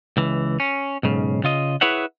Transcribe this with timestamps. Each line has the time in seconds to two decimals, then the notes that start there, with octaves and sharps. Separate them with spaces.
0.17 C#2 E3
0.60 C#4
1.03 B1 G#2 C#3
1.44 C#3 F4 D#5
1.81 E4 G#4 B4 C#5 E5 F#5